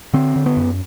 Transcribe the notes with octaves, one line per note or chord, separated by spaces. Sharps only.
D3 C4
D3
B3
F#2